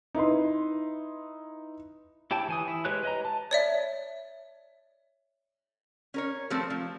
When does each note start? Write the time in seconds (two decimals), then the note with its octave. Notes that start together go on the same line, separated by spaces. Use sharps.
0.15 D#4 E4 B4 C6
2.31 E4 G4 C#5 G5 A5
2.48 E3 G#5 D#6
2.68 E4
2.85 G#3 G4 B4 C#5 F#6
3.03 B4 D#5 A#5
3.25 A5
3.51 C#5 D5 E5
6.14 C#4 A#4 C#5
6.50 F3 G3 A3 C4 A4
6.70 F3